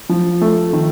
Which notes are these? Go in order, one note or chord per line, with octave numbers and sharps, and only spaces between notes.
F3
A3
D#3